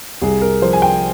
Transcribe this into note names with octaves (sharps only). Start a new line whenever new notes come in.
C2 G#4
A#4
F3 C5
G#5
G5